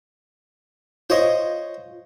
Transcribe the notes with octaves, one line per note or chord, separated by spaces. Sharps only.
F4 C5 C#5 D#5